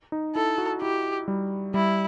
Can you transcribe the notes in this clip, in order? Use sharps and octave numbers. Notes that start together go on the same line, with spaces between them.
D#4
E4 A4
F#4
E4 G4
G3
G3 E4